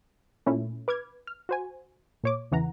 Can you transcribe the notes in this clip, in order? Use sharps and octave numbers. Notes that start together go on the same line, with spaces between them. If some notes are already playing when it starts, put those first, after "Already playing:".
A#2 A3 C#4 E4
B4 D6 F6 G#6
F6
F#4 C5 G#5
A#2 C#5 D6
E2 C#3 E3 F#5 A#5